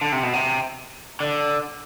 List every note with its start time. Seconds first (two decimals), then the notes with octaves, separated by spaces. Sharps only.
0.01 D3
0.12 C3
0.23 B2
0.33 C3
1.20 D3